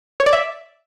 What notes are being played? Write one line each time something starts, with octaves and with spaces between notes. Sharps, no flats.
C#5
D5
E5